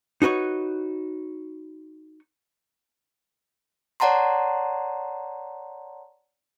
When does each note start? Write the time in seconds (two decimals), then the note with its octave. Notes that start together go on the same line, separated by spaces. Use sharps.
0.22 D#4 F#4 B4 C#5
4.00 C#5 D5 F#5 A5 A#5 C6